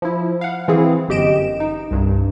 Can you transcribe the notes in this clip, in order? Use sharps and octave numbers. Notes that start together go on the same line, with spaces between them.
F3 E4
F5 F#5
E3 C4 E4 G#4
G1 F#2 G4 D#5 D7 E7
D#4
C2 G2